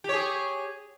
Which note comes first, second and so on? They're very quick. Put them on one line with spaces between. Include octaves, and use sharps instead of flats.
G4 C#5 G#4